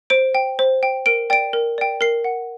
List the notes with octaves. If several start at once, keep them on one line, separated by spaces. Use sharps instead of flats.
C5 D7
G5
C5
G5
A#4 D7
D5 G5 D7
A#4
D5 G5
A#4 C7
F#5